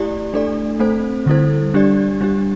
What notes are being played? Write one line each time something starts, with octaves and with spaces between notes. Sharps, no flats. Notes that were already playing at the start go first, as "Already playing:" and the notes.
Already playing: A3 E4 G4 D5
A3 D4 A4 D5
A3 C4 A4 C5
D3 G3 E4 A4 C5
G3 D4 G4 D5
G3 D4 G4